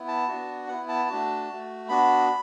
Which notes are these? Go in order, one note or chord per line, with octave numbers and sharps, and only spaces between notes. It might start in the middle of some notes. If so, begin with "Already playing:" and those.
Already playing: B3 E4
A5
B3 D4 F#4
B3 E4 F#5
A5
A3 D4 F#4
A3 F#4
B3 D4 F#4 B5